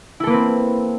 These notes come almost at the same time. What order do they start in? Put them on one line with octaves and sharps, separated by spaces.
E4 A4 A#3 B4 C4